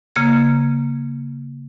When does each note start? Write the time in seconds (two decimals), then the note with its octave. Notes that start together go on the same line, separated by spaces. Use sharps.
0.16 C#3 A#3 A#5 G#6